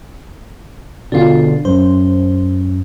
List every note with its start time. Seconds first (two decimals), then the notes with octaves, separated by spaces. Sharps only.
1.12 B2 D3 D4 F4
1.65 F#2 C5